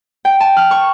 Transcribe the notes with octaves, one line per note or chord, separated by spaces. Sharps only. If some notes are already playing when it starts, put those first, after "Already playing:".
G5
A5
F6
C#6